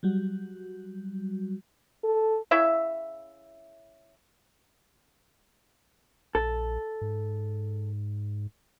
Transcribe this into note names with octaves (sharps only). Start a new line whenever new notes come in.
F#3 G3 F#4
A4
C#3 E4 C#5 E5
A#1 A4
G#2